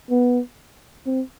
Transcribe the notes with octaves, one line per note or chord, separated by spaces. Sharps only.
B3
C4